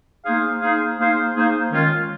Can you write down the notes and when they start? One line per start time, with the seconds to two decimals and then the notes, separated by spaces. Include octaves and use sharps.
0.25 A#3 D#4 G#4 C5 F5
0.62 A#3 D#4 G#4 C5 F5
0.98 A#3 D#4 G#4 C5 F5
1.35 A#3 D#4 G#4 C5 F5
1.71 D#3 G#3 C#4 F4